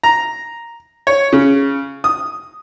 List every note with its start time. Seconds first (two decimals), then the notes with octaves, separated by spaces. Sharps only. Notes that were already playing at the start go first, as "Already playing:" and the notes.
0.03 A#5
1.07 C#5
1.33 C#3
2.04 D#6